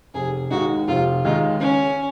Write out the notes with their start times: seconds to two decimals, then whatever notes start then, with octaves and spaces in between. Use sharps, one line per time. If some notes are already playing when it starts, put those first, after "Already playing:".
0.14 F1 G#4
0.51 D#2 D#3 G#3 D#4 F#4
0.88 F1 F4
1.25 D#2 D#3 G#3 D#4 F4
1.60 C#3 C#4